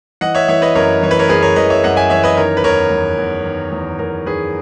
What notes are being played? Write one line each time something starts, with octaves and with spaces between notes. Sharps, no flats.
E3 D#5 F#5
C#5 E5
E3 C#5 E5
B4 D#5
F#2 A#4 C#5
E3 C#5
B4
A#4 C#5
F#2 G#4 B4
A#4 C#5
E3 B4 D#5
C#5 E5
F#2 D#5 F#5
E5 G#5
E3 C#5 E5
B4 D#5
D#3 A#4 C#5
B4
E2 A#4 C#5
E2
E2
D#3
E2
E2 A#4
D#3 G#4 B4